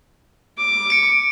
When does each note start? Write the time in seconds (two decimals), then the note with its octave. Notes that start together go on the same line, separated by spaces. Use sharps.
0.58 D6
0.90 C#7 D7